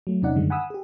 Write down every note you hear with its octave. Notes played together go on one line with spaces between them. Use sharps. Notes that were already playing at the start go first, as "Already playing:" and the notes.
F#3 A3
E2 C3 C#4 D#4 D5 F#5
F#2 D3 D#3 G3 G#3
F#5 G#5 B5 D#6 E6
G4 G#4